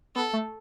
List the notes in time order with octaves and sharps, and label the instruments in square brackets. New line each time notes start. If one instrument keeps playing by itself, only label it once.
[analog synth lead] B3 [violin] A4
[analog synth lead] A3